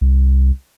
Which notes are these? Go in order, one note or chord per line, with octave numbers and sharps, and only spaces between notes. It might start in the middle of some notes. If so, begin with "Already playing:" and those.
C2